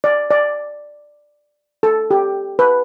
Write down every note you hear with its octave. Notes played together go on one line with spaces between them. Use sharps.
D5
D5
A4
G4
B4